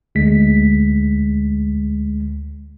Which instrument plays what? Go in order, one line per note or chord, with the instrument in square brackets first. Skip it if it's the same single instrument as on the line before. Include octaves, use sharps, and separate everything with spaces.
[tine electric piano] D2 G#3 B6